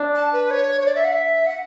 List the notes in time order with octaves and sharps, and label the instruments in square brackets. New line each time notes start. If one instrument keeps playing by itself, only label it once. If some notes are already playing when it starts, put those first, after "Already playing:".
Already playing: [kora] D4
[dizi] A5
B4
C#5
C#5
D5
E5
F#5
E5
F#5